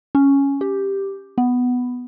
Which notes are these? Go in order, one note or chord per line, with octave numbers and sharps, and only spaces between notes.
C#4
G4
B3